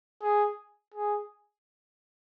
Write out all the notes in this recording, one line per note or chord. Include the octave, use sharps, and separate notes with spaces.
G#4
G#4